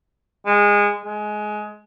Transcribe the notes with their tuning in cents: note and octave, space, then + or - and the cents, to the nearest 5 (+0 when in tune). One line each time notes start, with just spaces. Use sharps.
G#3 -20
G#3 +20